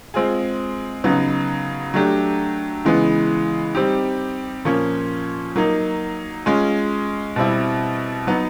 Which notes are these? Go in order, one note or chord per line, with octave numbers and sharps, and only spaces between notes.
G#3 C4 F4 G#4
C#3 F#3 B3 D#4
F#3 A3 D4 G4
C#3 E3 G#3 B3
G3 C4 D#4 G4
A#2 F3 A#3 C#4
F#3 A#3 D#4
G#3 C#4 F4
B2 G3 C4 E4
F#3 B3 D#4